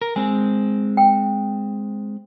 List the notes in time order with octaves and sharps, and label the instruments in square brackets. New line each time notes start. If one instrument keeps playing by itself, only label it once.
[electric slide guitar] A#4
[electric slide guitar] G#3 C4 [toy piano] G#5
[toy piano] G5